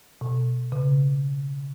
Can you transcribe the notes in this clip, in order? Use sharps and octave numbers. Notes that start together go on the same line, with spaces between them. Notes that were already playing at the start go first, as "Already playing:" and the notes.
B2
C#3